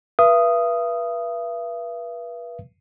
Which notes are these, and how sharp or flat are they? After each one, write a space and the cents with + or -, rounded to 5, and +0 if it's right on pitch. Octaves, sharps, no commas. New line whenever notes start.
B4 -30 E5 +45 D#6 -5